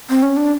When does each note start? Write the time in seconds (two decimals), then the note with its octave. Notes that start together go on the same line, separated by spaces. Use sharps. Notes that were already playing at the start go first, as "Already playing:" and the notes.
0.10 C4
0.22 C#4
0.37 D4